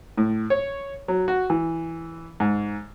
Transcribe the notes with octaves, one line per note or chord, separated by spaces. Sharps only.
A2
C#5
F#3
F#4
E3
G#2